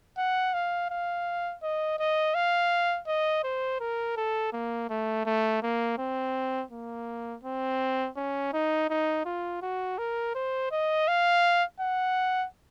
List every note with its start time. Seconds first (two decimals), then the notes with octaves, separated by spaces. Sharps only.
0.18 F#5
0.54 F5
0.90 F5
1.63 D#5
1.99 D#5
2.35 F5
3.08 D#5
3.44 C5
3.80 A#4
4.17 A4
4.53 A#3
4.89 A3
5.26 A3
5.63 A#3
5.98 C4
6.71 A#3
7.43 C4
8.17 C#4
8.54 D#4
8.90 D#4
9.25 F4
9.62 F#4
9.98 A#4
10.35 C5
10.72 D#5
11.08 F5
11.81 F#5